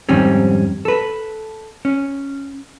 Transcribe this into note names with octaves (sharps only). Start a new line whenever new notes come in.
F2 G#2 D#3 G3 C4 C#4
A4 B4
C#4